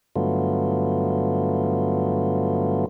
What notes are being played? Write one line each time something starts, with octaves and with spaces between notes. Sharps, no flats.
G2 D3 F#3 A3 B3 F4